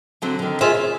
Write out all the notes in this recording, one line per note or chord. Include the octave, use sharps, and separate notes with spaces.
D3 F#3 C4
D3 D#3
F4 G#4 A#4 C5 D#5 E5
C#3